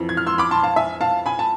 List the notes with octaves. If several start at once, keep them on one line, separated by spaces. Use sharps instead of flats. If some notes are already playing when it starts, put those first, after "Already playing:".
Already playing: F2 E3
G#6
F6
C6 E6
B5 D6
A5 C6
F5 A5
E5 G#5
F5 A5
G#5 B5
A5